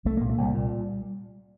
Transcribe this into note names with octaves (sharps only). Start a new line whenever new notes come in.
C2 A3
A#2 A#3
A3
C2 G3
A#2